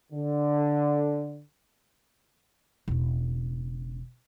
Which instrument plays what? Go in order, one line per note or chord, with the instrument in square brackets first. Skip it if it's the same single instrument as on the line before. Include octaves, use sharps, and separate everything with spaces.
[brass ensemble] D3
[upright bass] E1 C#3